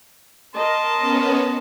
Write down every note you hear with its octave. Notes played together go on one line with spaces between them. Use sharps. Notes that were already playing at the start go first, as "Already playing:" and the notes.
A#4 D#5 A5 C6
B3 C#4